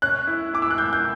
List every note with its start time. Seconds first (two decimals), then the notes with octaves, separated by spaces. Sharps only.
0.02 C#4 F#6
0.27 E4
0.53 E4 D6
0.62 E6
0.70 F#6
0.78 E4 G6
0.93 G6